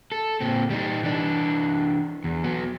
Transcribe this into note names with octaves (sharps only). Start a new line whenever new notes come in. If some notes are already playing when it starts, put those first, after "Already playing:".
A4
A#2 C4
G3 D#4
E3 D4
E2
F#3 B3